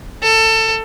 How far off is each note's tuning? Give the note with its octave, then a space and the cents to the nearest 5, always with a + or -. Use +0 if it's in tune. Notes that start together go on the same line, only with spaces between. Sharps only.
A4 +20